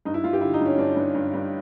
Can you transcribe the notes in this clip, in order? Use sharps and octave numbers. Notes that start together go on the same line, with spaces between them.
G2 D#4
E4
G2 F4
G4
D3 E4
D#4
G2 C#4
G2 D4
G2
G2
G2